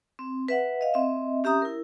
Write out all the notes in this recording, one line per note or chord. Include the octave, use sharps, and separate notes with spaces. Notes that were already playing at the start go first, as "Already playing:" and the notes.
C4
B4 E5 F#5
D#5 F5
C4 D#5 E5
C#4 G4 E5 A#5 D#6
E4 A#4